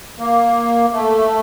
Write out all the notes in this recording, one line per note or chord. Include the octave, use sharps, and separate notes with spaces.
A#3
A3